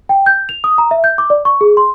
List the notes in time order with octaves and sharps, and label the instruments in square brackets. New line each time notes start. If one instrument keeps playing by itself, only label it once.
[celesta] G5
G6
F7
D#6
A#5
E5
G6
D6
D5
C#6
G#4
C6